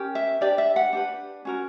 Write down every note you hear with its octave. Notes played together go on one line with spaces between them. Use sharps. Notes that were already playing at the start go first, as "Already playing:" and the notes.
Already playing: C#4 G4 A#4
E5
D4 G4 B4 D5
E5
F#5
D4 G4 B4
C#4 F#4 A#4